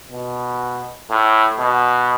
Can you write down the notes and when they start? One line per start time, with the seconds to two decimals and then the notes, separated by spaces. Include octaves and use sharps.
0.11 B2
1.10 A2
1.60 B2